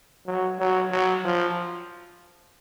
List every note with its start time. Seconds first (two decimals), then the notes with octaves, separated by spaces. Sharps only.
0.27 F#3
0.60 F#3
0.92 F#3
1.24 F3